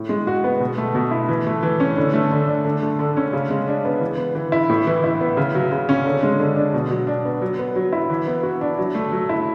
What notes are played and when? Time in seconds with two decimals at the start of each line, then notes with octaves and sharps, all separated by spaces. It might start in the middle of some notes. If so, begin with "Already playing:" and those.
Already playing: A2
0.09 G#3
0.27 F#4
0.44 B3
0.60 B2
0.78 A3
0.95 B2
1.11 E4
1.28 E3
1.46 A3
1.63 E3
1.80 C#4
1.97 D3
2.14 A3
2.31 D3
2.47 D4
2.65 D3
2.83 A3
2.99 D3
3.17 C#4
3.33 C#3
3.50 G#3
3.68 D4
3.85 B3
4.01 E3
4.18 B3
4.35 E3
4.52 E4
4.69 A2
4.87 E3
5.04 E4
5.21 B3
5.37 C#3
5.55 F#3
5.72 C#3
5.89 C#4
6.05 D3
6.23 G#3
6.40 D3
6.56 D4
6.73 B2
6.91 F#3
7.07 D4
7.25 B3
7.42 F#3
7.59 B3
7.76 F#3
7.92 E4
8.10 E3
8.27 B3
8.43 F#4
8.61 D4
8.78 F#3
8.95 A3
9.12 F#3
9.29 E4